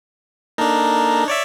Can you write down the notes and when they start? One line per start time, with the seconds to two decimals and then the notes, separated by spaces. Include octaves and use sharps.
0.58 A#3 D4 D#4 A4 A#4
1.28 C#5 D5 E5